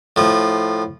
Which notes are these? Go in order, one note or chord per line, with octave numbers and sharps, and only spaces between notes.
A2 F3